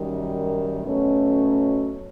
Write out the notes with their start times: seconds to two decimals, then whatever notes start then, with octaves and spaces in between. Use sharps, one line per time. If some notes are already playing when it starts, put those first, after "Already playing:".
Already playing: F#2 D#3 G3
0.84 B2 F#3 A3 C#4